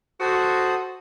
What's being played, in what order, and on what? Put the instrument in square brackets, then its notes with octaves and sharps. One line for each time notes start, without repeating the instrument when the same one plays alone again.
[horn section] F#4 [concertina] A4 C5 D#6